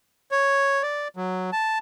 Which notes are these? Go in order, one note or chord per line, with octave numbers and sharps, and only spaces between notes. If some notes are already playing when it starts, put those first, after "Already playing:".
C#5
D5
F#3
A5